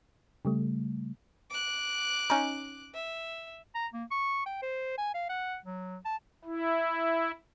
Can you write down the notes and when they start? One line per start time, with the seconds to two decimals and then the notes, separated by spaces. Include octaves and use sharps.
0.45 C#3 G3 A3
1.50 D6 F#6
2.30 C#4 D#4
2.94 E5
3.75 A#5
3.93 A#3
4.11 C#6
4.46 G5
4.62 C5
4.98 G#5
5.15 F5
5.29 F#5
5.65 F#3
6.05 A5
6.45 E4